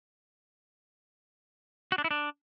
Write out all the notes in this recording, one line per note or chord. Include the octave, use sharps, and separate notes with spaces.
F#4
D4
E4
D4